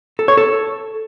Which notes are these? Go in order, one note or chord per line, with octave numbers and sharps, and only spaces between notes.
A4
C#5
A4